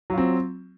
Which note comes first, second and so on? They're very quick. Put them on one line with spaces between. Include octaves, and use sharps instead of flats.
F#3 F4 C4